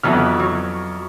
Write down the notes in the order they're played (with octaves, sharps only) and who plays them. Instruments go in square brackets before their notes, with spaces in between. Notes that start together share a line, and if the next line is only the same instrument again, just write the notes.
[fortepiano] F2 E5 F6 [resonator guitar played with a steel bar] E3 F#3 B3
[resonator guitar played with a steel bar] F#3